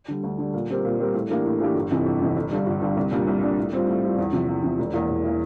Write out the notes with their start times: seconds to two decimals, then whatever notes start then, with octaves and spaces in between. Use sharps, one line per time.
0.08 D3 G3
0.23 D2
0.38 D3 G3
0.54 A#2
0.69 G3 C4 G4 A#4
0.85 A#2
0.99 G3 C4 G4 A#4
1.14 A2
1.30 E3 A#3 D4 G4
1.45 A2
1.60 E3 A#3 D4 G4
1.75 G1
1.91 F2 C3 E3
2.06 G1
2.20 F2 C3 E3
2.36 G1
2.51 G2 D3 G3
2.66 G1
2.82 G2 D3 G3
2.97 C2
3.12 A#2 G3 D4
3.27 C2
3.42 A#2 G3 D4
3.58 A2
3.73 G3 C4 F4
3.88 A2
4.03 G3 C4 F4
4.18 E2
4.33 C3 F3
4.49 E2
4.64 C3 F3
4.79 E1
4.93 E2 E3 A#3 E4
5.10 E1
5.24 E3 A#3 E4